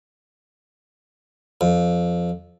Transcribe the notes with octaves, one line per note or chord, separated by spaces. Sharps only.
F2